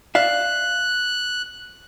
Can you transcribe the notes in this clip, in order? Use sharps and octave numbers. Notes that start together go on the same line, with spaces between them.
D5 E5 F5 F#6